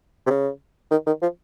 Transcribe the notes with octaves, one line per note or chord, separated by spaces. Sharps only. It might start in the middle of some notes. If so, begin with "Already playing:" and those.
C3
C#3
D#3
D#3
F3